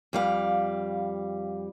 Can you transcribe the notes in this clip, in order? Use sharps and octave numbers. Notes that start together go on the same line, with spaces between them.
F2 G3 F5